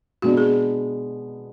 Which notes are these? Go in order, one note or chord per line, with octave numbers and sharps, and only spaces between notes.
B2 G#3 B3 D4 F#4
G#4